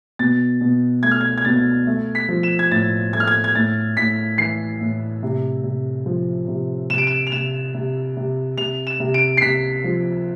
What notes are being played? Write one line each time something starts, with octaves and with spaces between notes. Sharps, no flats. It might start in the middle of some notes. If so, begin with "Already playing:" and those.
B2 A6
B2
A3 G#6
F6
G#6
G#6
B2 A6
A3
B6
F3
E7
G#6
A2 A6
A3 G#6
F6
G#6
G#6
A2 A6
A2 B6
E3 C7
A2
C3
C3
F3
C3
C3 E7
D7
E7
F7
C3 E7
C3
C3
C3 F7
E7
C3
D7
C7
C3 B6
F3